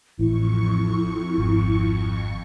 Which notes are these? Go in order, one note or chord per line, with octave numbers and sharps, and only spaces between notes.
A1 F2 E4 C#6
G#1